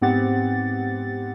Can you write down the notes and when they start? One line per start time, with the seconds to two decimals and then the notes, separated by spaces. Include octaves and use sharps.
0.01 G#2 B3 C4 G4 F#5 A6